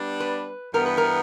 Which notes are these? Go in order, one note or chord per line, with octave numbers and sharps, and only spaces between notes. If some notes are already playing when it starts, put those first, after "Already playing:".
Already playing: G3 B3 D4
B4
G2 E3 B3 A#4
B4
A#4